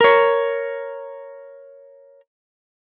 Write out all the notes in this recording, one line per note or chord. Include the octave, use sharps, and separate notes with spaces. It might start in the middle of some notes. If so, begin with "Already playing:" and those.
A#4 C#5